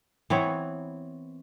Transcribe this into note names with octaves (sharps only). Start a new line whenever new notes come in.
E3 B3 C4 C#5